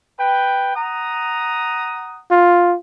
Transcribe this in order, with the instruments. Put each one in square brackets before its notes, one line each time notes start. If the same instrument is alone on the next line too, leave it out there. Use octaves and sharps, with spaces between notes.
[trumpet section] B4 G5
F#5 A#5 D#6
[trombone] F4